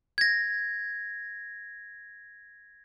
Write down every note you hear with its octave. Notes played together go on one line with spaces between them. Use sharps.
G#6 A#6